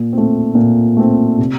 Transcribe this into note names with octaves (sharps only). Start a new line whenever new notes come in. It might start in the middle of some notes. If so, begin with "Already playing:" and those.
Already playing: A#2
A3 C4
A#2
A3 C4
C3